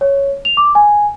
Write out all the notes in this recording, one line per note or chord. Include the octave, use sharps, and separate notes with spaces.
C#5
F7
D6
G#5